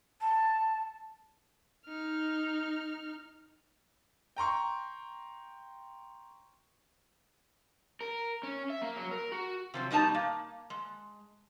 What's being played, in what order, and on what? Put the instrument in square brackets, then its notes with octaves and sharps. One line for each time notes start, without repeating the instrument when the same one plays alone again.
[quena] A5
[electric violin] D#4 F6
[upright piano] G5 A#5 C6 C#6
[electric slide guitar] A#4
C#4
E5
A#3
F#3
A#4
F#4
[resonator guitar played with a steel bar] C3 F3 F#3
B2 G3 D#4 B4 A5 A#5
A#3
G#3